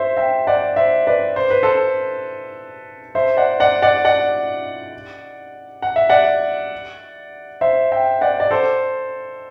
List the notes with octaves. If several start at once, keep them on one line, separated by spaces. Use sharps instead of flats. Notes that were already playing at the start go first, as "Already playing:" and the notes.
Already playing: C5 E5
E5 G5
D5 F#5
C5 E5
B4 D5
C5
B4
A4 C5
C5 E5
D5 F#5
D5 F#5
D5 F#5
D5 F#5
F#5
E5
D5 F#5
C5 E5
E5 G5
D5 F#5
D5
A4 C5